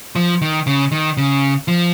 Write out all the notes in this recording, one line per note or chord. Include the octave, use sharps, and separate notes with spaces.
F3
D#3
C#3
D#3
C#3
F3